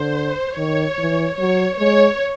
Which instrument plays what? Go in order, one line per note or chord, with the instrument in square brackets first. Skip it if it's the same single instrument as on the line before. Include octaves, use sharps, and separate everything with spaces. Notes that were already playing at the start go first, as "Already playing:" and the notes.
Already playing: [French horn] D3 [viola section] C5
[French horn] D#3 [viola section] C#5
[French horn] E3
[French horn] F#3 [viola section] C#5
[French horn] G#3 [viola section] C#5